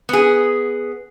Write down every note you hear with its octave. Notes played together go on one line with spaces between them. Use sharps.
B3 G#4